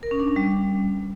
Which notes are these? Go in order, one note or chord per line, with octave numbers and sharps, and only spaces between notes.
A#4
C#4
D4
C#4
G3